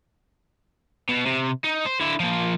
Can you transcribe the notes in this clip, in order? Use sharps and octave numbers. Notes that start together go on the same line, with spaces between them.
B2
C3
D#4
C5
D3 E4
F3 A#3